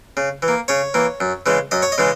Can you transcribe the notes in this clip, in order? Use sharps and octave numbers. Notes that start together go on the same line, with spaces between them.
C#3
E3
A#3
C#3 C#5
E3 A#3
F#2
C#3 E3 G#3
F#2 D#5
C#5
D#5
C#3 E3 G#3